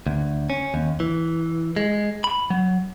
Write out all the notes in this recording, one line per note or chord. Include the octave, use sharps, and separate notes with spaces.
D2
C#4
D#2
E3
G#3
B5
F#3